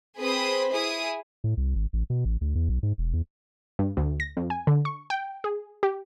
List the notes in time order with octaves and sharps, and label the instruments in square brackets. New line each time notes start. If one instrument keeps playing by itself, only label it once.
[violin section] C4 G#4 B4 C5 B5 D#6
E4 G#4 D#6
[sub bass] A2
C2
G#1
A1
B2
A1
D2
E2
B1
G#2
E1
E2
[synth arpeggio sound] G2
D2
A#6
F2
G#5
D3
C#6
G5
G#4
G4